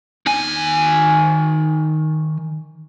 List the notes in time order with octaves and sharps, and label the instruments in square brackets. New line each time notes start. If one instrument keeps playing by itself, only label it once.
[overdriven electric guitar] D#3 G#5